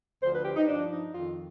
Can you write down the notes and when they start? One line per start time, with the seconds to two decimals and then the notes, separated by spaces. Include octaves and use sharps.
0.22 D2 D3 F3 C5
0.33 B4
0.45 G4
0.57 D#4
0.68 G2 F3 D4
0.91 D#4
1.14 F2 D#3 F4